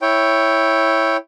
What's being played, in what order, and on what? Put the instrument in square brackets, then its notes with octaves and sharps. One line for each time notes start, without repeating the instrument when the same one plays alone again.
[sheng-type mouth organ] E4 C#5 G5